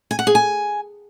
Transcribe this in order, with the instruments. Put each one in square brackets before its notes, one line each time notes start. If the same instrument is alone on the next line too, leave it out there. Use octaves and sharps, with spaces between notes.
[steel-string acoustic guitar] G#5
F#5
G#4
G#5